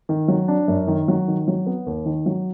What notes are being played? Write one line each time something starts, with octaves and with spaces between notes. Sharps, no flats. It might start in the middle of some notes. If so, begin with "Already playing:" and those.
D#3
F#3
D4
F#2
D#3
F#3
D#3
F#3
B3
D#2
D#3
F#3